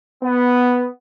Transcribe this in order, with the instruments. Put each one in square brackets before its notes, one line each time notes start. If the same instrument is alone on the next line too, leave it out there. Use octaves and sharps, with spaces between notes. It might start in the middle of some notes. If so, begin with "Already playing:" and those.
[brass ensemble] B3